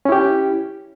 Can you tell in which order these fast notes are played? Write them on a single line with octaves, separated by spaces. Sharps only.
C#4 E4 G4